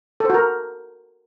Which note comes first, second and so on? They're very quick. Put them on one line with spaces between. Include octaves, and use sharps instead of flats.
A4 C5 F#4 A#4